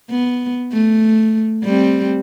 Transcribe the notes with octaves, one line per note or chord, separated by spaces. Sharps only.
B3
A3
G3 C4